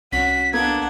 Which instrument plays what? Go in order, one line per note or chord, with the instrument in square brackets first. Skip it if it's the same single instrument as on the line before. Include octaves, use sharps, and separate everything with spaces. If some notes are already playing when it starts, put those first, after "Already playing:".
[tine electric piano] C2 [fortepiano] C#4 [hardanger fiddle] F#4 [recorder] B6
[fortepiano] A#3 B3 A4 [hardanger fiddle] D4 F#5 [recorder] G#6